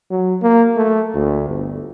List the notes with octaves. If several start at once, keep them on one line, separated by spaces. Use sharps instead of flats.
F#3
A#3
A3
D2
G1